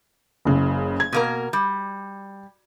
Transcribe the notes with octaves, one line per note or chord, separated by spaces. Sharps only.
F#1 C#3
G#6
B2 A#3 A#4
G3